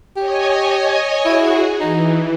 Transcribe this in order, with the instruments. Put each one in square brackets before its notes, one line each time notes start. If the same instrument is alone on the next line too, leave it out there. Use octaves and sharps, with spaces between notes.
[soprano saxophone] G4 [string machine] C#5 D#5 G#5
[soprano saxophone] E4 [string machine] F#4 G#4
[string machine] E3 [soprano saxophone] D#4